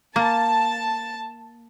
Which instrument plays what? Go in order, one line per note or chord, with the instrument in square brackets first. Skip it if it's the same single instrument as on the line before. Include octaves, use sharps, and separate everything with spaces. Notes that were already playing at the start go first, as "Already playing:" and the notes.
[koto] A#3 [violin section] A5